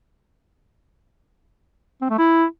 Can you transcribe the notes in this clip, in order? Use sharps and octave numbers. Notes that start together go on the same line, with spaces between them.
C4
A3
E4